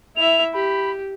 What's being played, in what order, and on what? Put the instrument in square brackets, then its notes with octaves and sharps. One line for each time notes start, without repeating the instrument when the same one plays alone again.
[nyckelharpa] E4 E5 [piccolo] F7
[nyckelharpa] G4 [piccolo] B5